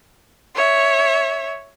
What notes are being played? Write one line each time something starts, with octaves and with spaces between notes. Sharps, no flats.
C#5 E5